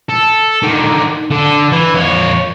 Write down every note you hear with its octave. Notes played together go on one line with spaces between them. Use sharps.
A4
D3 D#3
D3 A4
E3 E4
F2 C#5